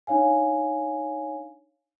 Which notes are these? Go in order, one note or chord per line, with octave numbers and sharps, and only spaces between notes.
D4 D#4 C#5 F5 G#5